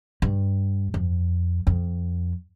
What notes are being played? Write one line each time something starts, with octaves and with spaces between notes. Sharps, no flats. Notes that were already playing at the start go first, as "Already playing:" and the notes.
G2
F2
F2